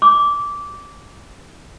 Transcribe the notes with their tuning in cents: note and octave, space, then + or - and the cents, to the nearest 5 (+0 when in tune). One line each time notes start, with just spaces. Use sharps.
D6 -15